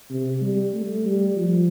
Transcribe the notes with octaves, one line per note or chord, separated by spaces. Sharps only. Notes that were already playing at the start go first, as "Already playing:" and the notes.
C3
G3
A3
G3
F3